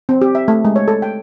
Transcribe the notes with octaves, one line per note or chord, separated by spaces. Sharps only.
C4
G4
E5
A3
G#3
C#5
A4
G5